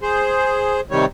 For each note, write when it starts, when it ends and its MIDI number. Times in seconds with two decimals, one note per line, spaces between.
0.01 0.81 68
0.01 0.81 72
0.91 1.05 48
0.91 1.05 51
0.91 1.05 55
0.91 1.05 73